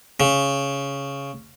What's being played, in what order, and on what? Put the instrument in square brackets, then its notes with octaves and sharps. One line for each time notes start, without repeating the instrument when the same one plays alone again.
[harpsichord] C#3